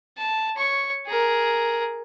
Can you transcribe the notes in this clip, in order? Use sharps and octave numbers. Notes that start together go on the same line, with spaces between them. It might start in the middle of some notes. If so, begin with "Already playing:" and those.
A5
C#5 C#6
G#4 A#4